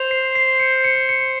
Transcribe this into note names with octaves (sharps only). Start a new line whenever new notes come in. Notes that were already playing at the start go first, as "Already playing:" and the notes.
Already playing: C5 F7
C7
C7
C#7
C#7
C#7